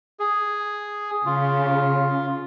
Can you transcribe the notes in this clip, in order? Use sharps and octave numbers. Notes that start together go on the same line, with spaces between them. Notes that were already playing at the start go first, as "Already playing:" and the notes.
G#4
C#3 F4